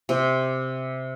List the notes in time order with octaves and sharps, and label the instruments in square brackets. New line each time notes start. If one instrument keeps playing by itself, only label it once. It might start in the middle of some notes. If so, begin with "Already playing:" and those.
[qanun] C3